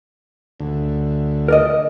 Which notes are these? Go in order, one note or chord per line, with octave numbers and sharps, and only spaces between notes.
D2
A#4 D5 D#5